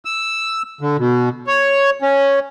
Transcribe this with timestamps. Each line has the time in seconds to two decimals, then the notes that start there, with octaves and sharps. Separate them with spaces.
0.05 E6
0.81 D3
0.99 B2
1.47 C#5
2.02 C#4